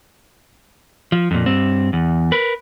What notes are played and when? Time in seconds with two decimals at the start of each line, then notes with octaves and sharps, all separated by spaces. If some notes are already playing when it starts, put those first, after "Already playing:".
1.12 F3
1.31 F2 A#2
1.46 G2 C4
1.93 E2
2.32 A#4 B4